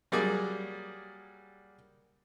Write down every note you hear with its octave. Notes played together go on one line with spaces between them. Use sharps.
F#3 G3 A#3 G#4 D5